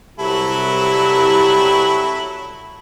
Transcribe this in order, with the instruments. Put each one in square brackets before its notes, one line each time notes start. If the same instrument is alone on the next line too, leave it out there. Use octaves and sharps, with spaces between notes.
[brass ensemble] C2 G4 [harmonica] F#3 E4 A4